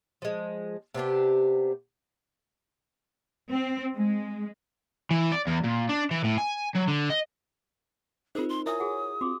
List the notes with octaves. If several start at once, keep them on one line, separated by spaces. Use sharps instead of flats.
F3 G#3
C3 B3 D4 G4
C4
G#3
E3
D5
E2
A#2
D4
E3
A2
G#5
F#3
D3
D#5
C4 D#4 F4 G#4 A#4 C5
C6
E4 A#4 C#5 E5 G#5 D#6
F#4 G#4 F#5
C4 F4 F#4 D6